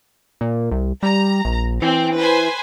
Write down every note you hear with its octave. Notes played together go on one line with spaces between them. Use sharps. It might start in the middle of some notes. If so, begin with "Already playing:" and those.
A#2
C2
G3 A#5
A#1
E3 C4
B4 C5 G#5